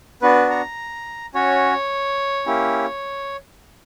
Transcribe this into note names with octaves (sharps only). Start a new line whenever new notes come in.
B3 D4 F#4 B4
A#5
C#4 F#4 C#5
A#3 C#4 E4 G4